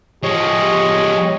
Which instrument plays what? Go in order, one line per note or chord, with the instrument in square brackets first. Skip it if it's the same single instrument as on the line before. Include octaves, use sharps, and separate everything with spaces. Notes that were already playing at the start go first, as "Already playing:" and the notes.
[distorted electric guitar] F3 G#3 [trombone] G4 [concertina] C#5 D#5